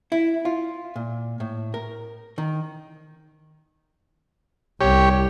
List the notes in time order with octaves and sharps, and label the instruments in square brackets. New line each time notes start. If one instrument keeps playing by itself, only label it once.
[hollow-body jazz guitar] E4
F4
A#2
A2
A#4
D#3
[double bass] C2 [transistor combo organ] G4 C#5